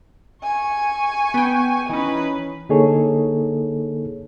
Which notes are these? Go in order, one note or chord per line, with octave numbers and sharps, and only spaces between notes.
G#5 C#6
B3 G5
E3 C#4 D#4 B4
D3 A#3 D#4 G#4 A4 C#5